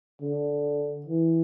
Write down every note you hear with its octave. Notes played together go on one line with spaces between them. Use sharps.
D3
E3